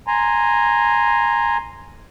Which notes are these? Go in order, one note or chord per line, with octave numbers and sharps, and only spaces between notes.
G#5 A#5 C6